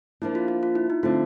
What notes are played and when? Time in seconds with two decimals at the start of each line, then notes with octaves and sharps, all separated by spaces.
0.22 F3 A#3 D4 E4
0.35 F4
0.48 F4
0.63 F4
0.75 E4
0.90 D#4
1.03 D3 F3 A3 C4 F4